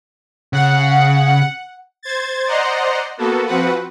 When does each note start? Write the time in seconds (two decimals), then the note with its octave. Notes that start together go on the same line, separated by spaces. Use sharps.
0.53 C#3 F#5
2.03 C5 G#6 A6
2.47 C5 D5 D#5 F#5 A#5 C6
3.17 A#3 B3 F#4 A4
3.46 F3 C4 F#4 B4 F#5